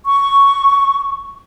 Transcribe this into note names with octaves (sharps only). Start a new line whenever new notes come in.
C#6